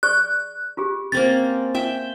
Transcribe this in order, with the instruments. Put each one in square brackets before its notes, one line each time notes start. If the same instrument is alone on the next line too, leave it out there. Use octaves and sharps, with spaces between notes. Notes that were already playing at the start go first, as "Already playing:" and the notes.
[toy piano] G#4 D5 C#6 [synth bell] F#6
[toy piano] F4 G4 G#4
[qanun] A#3 C4 C#4 [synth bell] A6
[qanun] E5 G5